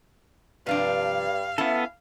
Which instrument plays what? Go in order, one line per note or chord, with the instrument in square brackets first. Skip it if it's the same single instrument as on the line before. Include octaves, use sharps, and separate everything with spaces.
[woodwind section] G2 [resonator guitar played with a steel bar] C3 F3 D4 [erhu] F5
[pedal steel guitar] B3 A4 [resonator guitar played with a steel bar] C#4 E4 E5